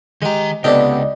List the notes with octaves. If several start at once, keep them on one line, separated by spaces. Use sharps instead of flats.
D#3 G#3 G4 A#5
C#2 C3 B3 D4 A4 D5 D#5 G5